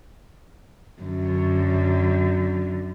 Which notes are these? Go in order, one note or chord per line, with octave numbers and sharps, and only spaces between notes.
F#2 D3